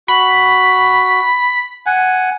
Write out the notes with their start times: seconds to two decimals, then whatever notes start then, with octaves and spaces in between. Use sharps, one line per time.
0.08 F#4 B5
1.86 F#5 G#5